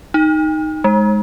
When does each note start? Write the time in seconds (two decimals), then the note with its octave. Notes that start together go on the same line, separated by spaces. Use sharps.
0.14 D#4
0.84 G#3